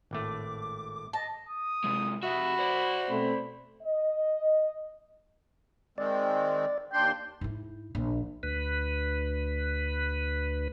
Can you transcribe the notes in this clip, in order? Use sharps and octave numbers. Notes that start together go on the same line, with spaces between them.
G#1 A2 A3 D6
D#5 A5
D#6
C3 G#3
F2 F#4 E5 B5
C5 D5
B2 A3 C4 B5
D#5
D#3 G#3 C4 D5
D#2 D4 G5 C6
G#2 E4
A#1
D2 B4